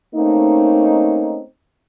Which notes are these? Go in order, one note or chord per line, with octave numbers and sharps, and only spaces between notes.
A3 A#3 C4 C#4 D#4